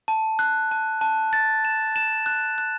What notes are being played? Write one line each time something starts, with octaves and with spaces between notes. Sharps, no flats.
A5
F#6
A5
A5
A6
E7
E7
F#6
F#6